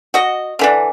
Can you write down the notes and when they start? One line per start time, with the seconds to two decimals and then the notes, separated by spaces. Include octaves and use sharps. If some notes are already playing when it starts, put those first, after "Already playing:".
0.14 F#4 D#5
0.59 D3 E3 D4